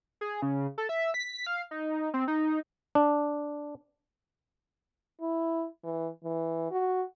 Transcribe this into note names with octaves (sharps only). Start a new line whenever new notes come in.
G#4
C#3
A4
E5
B6
F5
D#4
C4
D#4
D4
E4
E3
E3
F#4